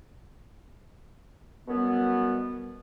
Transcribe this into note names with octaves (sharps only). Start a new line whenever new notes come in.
F#2 B2 G3 B3